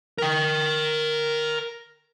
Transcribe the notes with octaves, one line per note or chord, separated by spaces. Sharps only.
A#4 G5